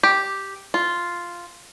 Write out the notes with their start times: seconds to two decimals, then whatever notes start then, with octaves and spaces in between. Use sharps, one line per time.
0.03 G4
0.74 F4